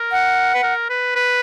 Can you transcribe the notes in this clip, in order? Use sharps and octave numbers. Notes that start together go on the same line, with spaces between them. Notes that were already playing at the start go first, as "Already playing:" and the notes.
Already playing: A#4
F#5
B4
A#4
B4
B4